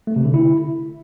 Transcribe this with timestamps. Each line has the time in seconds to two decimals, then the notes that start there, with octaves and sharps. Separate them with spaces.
0.07 A3
0.16 C3
0.25 D3
0.34 E4